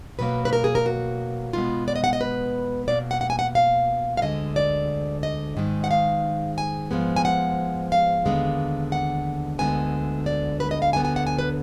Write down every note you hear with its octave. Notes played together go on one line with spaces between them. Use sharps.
B2 F#3 A#3 B4
B4
A#4
G#4
A#4
F#4
B2 G#3 B3 F4
D5
D#5
F#5
D#5
B4
B2 A#3 D5
F#5
F#5
G#5
F#5
F5
F5
D2 D3 G#3 D#5
D5
D#5
G#2 D#3 G#3
F#5
F5
G#5
G#2 F3 G#3 B3
G#5
F#5
F5
D#2 D3 G#3 B3
F#5
D2 D3 G#3 B3 G#5
D5
B4
D#5
F5
D2 D3 F#3 B3 G#5
G#5
F#5
G#5
B4